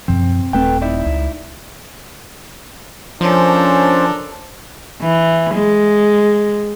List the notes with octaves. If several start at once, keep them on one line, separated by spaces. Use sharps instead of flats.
F#2 B2 F3 C4
D#1 A3 C4 A4 B4 G5
D#4 E4 D5
C#2
F3 C#4 D4 A4 A#4 C5
E3
G#3